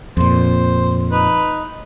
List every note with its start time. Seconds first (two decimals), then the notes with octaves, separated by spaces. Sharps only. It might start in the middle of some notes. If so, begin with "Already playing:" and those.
0.17 F2 A#2 C5
1.11 D#4 B4